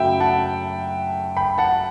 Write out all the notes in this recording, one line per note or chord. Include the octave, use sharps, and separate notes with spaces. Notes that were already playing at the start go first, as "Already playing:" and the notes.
Already playing: F#2 C#3 F#3 A3 E5 G5 B5
F#5 A5
G5 B5
F#5 A5